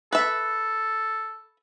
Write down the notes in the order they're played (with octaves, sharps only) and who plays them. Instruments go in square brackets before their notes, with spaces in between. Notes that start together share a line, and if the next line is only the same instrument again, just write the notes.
[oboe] A4 [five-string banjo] B4 E5